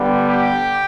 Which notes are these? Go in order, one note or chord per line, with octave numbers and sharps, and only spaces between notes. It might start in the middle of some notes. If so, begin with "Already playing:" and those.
Already playing: D3 G3 B3
G4